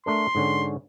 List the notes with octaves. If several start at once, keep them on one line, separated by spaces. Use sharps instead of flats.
A3 D4 A#4 C6
G#2 D3 C#4